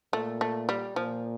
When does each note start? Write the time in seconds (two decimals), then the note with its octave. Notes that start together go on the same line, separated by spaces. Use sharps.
0.13 A#2 A3
0.41 A3
0.69 G3
0.96 A#2 F3